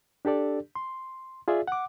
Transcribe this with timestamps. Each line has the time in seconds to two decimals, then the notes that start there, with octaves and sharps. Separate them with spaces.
0.25 D4 G4 A4 D5
0.75 C6
1.48 F4 G#4 D5 E5
1.68 F#5 D6